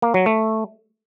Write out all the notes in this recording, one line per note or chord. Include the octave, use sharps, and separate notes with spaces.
A#3
F#3
A3